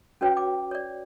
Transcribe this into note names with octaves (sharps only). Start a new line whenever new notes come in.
C#4 F#4 B4 C#5 G5
D6
C#5 D5